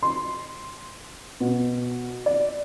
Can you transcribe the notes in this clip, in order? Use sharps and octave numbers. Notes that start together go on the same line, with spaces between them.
C6
B2
D5